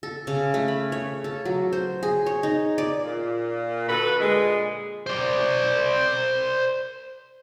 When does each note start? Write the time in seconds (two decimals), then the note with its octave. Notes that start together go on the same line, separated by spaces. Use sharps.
0.03 A4
0.27 C#3
0.54 A3
0.68 B5
0.92 C#5
1.24 A4
1.45 F#3
1.73 C5
2.03 G#4
2.26 C#5
2.43 D#4
2.78 D5
3.04 A#2
3.88 D3 F#4 A4 B4
4.20 A#2 D3 G#3
5.07 C5 D5